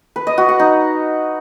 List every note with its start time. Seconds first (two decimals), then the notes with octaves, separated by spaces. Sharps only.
0.16 B4
0.27 D#5
0.38 F#4
0.49 F#5
0.60 D#4